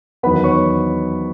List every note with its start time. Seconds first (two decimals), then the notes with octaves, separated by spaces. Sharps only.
0.23 E2 D#3 F#3 B3 B4 B5
0.44 C#5 C#6